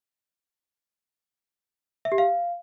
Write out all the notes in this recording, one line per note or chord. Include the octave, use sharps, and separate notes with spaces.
E5
G4
F5